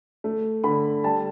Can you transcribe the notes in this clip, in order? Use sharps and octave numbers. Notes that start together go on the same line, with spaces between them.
A3
D3 B5
G3 A5